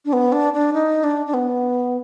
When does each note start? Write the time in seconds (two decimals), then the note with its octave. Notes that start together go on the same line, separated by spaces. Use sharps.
0.05 D4
0.13 B3
0.32 D4
0.53 D4
0.73 D#4
1.04 D4
1.26 D4
1.34 B3